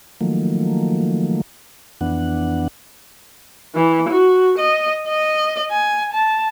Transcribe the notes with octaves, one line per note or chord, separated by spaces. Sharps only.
D#3 F3 F#3 A3 A#3
F2 E3 B3 D4 F#5
E3
F#4
D#5
D#5
G#5
A5